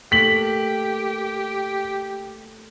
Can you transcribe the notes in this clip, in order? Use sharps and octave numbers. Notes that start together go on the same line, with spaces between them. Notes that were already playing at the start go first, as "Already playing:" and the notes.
A3 A#3 G4 A4 B6 F#7